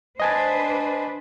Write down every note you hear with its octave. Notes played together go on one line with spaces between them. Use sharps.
D4 B4 C5 D#5 G#5 A5